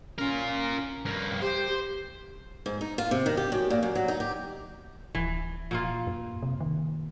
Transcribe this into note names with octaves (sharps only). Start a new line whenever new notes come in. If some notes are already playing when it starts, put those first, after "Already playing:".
C#4 F4 A#4
G2 A#3
G4 C5
G#2
D#4
F4
C3
D#3
G4
F#2
A#2
F#2
F#3
D#4
G4
D1 E3
A#2 A#3 F4
F#2
C3
D#3